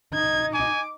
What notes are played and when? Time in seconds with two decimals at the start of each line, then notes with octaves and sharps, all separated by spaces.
0.13 D#4 G#6
0.54 G#5 D6